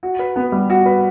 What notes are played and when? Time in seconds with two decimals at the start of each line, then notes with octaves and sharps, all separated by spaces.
0.03 F#4
0.19 B4
0.36 B3
0.52 G3
0.70 F#4
0.86 B4